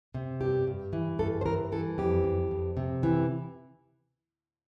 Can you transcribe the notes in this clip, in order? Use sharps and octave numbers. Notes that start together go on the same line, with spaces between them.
C3
G2 G4
G2
E3
G2 A4
C5
E3 A#4
E3 A4
F2 G4
F2
F2
C3
E3